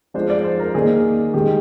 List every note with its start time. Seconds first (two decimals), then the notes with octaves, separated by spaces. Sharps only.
0.14 F3 G#3 D4 C5
0.30 D5
0.44 C5
0.60 A#4
0.75 D#3 A#3 D#4 G#4
1.34 D#3 G#3 D#4 G4